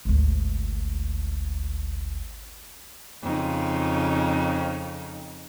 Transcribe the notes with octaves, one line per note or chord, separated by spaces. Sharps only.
G#1 D2
F2 C#3 D#4